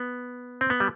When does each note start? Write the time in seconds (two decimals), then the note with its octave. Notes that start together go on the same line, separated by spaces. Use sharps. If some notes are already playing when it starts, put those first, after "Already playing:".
Already playing: B3
0.61 C4
0.70 B3
0.80 G3